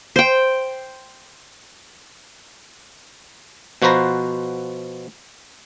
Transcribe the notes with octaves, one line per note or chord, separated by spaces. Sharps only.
C5 G5
B2 F3 F#4 B4 C5 A#5